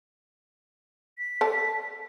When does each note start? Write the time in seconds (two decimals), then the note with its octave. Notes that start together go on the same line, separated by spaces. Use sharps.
1.18 B6
1.41 A4 D5 A5